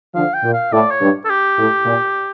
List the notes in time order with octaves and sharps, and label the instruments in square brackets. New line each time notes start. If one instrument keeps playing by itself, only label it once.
[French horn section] D3 F3 [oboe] F5
[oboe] G5
[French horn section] A#2
[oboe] F5
[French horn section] A2 [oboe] D5
[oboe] C#5
[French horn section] G2
[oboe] A4
G4
[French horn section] A2
A#2